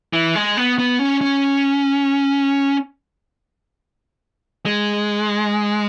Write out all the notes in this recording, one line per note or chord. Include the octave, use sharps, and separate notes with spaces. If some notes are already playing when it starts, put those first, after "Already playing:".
E3
G#3
B3
B3
C#4
C#4
G#3